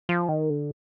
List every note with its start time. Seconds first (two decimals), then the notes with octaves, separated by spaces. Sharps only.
0.09 F3
0.29 D#3
0.50 D3